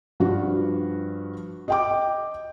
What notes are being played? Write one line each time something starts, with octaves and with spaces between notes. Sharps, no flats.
G2 F3 D4 F#4
D#5 G5 D6